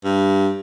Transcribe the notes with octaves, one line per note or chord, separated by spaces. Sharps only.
G2